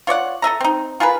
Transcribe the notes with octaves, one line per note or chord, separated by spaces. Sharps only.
F4 C#5 D5 F#5
A4 D#5 E5 A#5
C4 D#4
F4 G#4 A#4 B4